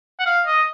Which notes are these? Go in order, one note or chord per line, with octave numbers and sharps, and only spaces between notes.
F#5
F5
D#5